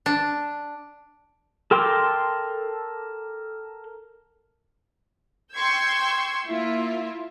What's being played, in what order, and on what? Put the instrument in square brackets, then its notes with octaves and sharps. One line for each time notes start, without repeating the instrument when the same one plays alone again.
[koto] D4
[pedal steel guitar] A4 A#4 G5 C6 D6
[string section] G5 C6 C#6 E6 G6 G#6
A#3 E4 F4 E5